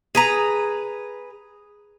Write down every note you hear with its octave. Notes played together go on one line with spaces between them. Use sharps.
G#4 B4 A#5